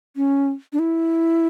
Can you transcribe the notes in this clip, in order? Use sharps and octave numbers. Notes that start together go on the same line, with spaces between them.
C#4
D4
E4